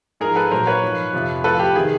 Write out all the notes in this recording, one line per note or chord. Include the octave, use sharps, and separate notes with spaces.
G#2 F3 G#4 A#4
A4 B4
A#2 F#3 A#4 C5
B4 C#5
G#2 F3
F2 C3 F3
A2 F3 A4 B4
G4
C3 D#3 G#4